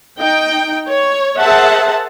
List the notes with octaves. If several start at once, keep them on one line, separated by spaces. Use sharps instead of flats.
D#4 G5
C#5
G#4 A#4 C5 E5 F#5 A5